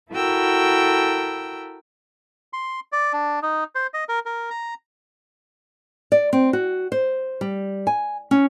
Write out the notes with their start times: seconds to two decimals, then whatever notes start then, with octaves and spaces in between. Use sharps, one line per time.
0.12 E4 F#4 A4 A#4 G5 E6
2.53 C6
2.92 D5
3.13 D4
3.42 D#4
3.75 C5
3.94 D#5
4.09 A#4
4.26 A#4
4.51 A#5
6.12 D5
6.33 C4
6.53 F#4
6.92 C5
7.41 G3
7.87 G#5
8.31 C#4